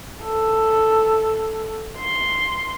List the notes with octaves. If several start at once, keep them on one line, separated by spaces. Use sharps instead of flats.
A4
C6